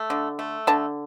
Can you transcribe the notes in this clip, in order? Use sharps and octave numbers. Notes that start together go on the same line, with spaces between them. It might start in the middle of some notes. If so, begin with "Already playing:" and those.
Already playing: A3
D3
A3
D3 A5